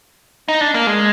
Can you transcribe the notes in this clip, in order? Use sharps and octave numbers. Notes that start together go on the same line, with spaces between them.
D#4
D4
A#3
G#3